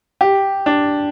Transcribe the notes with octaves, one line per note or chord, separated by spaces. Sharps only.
G4
D4